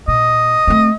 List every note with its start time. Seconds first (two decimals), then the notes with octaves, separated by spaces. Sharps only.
0.08 A#2 D#5
0.67 A3 C4